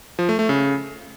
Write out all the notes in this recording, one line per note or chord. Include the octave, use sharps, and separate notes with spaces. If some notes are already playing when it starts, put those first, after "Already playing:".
F3
A3
A3
C#3